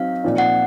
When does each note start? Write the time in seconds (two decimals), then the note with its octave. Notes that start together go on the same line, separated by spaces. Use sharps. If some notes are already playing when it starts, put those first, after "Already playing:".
Already playing: F#3 C4 D#4 F5
0.24 A#2 F3 C4 D#4
0.38 F#5